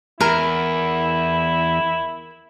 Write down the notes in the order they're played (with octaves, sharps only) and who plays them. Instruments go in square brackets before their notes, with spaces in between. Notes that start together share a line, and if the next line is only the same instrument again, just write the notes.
[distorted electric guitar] E2 [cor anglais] E4 [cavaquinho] A#4